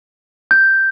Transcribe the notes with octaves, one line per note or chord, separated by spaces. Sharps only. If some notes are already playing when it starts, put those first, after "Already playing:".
G6